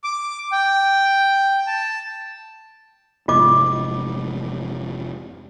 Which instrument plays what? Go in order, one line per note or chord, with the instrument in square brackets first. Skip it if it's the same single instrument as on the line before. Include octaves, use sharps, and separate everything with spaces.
[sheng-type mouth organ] D6
G5
A5
[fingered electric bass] F1 G#2 [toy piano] F4 D#5 D6